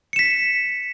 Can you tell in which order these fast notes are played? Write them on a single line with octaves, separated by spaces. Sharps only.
C#7 E7 B6